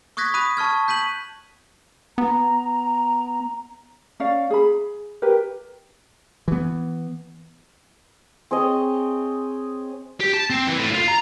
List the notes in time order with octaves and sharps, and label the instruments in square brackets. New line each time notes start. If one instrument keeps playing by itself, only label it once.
[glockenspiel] C#6 D#6 F#6 G#6 A#6 B6
B5 D#6 F#6 D#7
A5 C#6 F6 G#6
G6 B6 D#7 F#7
[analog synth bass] B3 [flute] A#5
[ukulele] C#4 D5 F5
G#4 B5
G4 A#4 B4
[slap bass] E3 B3
[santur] C4 G#4 C#5 D#5
[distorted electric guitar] G4
A5
C4
E3
A2
F4
A#5